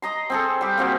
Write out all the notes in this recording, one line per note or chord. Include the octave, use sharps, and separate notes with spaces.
D#5 A#5 C6
C4 G#4 A4
G3 G4
A#3 C4 F#4 G#4